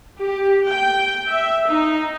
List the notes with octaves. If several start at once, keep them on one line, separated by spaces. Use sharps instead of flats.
G4
G5
E5
D#4